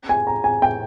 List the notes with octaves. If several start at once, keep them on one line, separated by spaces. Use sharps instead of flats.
G#5
A#5
G#5
G5